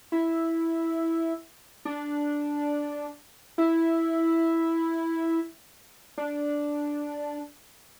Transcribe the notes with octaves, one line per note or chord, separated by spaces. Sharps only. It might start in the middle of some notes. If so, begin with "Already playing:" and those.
E4
D4
E4
D4